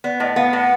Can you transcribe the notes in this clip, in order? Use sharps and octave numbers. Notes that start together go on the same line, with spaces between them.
B3 D5
A2 D#5
B3 F5
A2 F#5